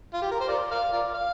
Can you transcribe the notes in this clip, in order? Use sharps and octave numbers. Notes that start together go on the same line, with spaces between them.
F4
G4
A#4
C5
F4 A#4 D5
A#4 D5 F5
F4 A#4 D5
F5